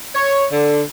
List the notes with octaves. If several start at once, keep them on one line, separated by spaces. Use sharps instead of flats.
C#5
D3